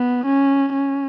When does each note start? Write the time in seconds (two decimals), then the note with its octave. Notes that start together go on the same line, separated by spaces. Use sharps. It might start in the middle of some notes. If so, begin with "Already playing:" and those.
Already playing: B3
0.26 C#4
0.72 C#4